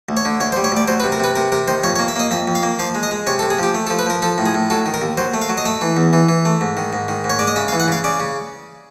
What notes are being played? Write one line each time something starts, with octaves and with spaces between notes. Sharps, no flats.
D2
C#5
D3
D2 C#5
C5
G3
C#5
D2 D5
F#3 C5
B4
C3
A#4
C3 B4
C3 A#4
C3 A#4
D#3 C5
F2 C#5
C#5
A#3
E5
A#3 D#5
F2 E5
F2
F5
A#3
F3 F5
G#3
D#5
G#3
C3 C#5
A4
C3
G#4
F3 G4
A3
A4
F3
B4
F3 A#4
F3 A4
A2
G#4
A2
F#3 A4
D#3
A#4
D#2
F#3 C5
A3
F5
F#3
D#5
A3 E5
E3
E2
E3
E3
A3
G#2
D#3
G#2
D#3
G#2
C#5
G#3 D5
D#5
C#3 E5
F5
E3
F#5
C#3 F5
C#3 D5
C#3